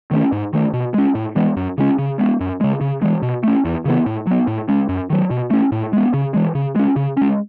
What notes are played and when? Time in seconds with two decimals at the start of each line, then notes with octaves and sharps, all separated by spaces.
0.11 D#3 A3 C#4
0.32 G#2
0.53 D#3 A3
0.73 B2
0.94 G#3 C#4
1.15 A2
1.36 E3 G#3 B3
1.56 F#2
1.78 C#3 G#3 C#4
1.99 C#3
2.19 G#3 B3
2.40 F#2
2.61 C#3 G#3
2.81 C#3
3.02 E3 G#3
3.22 B2
3.44 A3 C#4
3.65 E2
3.85 C#3 E3 B3
4.06 A2
4.27 F#3 B3
4.47 A2
4.69 G#3 C#4
4.89 F#2
5.10 D#3 F#3
5.31 B2
5.51 A3 C#4
5.72 A2
5.93 G#3 B3
6.14 C#3
6.34 E3 G#3
6.55 C#3
6.76 G#3 C#4
6.96 C#3
7.17 G#3 C#4